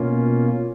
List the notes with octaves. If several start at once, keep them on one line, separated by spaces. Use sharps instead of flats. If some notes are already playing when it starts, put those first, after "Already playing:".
Already playing: B2 A#3 C#4 F4